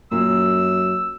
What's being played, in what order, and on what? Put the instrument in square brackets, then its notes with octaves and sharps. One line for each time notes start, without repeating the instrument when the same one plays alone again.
[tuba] F#2 [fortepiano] A#2 [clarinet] E6